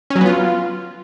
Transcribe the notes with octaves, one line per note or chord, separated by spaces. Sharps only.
C#4
F#3
B3
F4